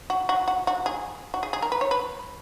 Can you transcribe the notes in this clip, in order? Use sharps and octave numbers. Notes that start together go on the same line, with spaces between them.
F#4
F#4
F#4
F#4
G#4
F#4
G#4
G#4
A#4
B4
C#5
B4